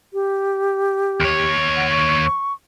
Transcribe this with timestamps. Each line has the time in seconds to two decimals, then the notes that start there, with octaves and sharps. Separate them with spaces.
0.13 G4
1.21 D#2 C#5
1.76 F#5
1.90 C#6